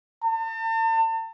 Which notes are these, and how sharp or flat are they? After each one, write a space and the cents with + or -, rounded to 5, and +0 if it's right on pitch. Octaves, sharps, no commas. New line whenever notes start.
A5 +40